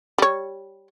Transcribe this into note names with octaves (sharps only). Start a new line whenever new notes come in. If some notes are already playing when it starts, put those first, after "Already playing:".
G3 C#5